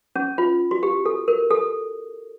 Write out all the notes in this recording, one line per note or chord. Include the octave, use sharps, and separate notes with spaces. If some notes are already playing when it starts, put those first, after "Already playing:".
C#4
F4
F#4
G4
A4
A#4
A4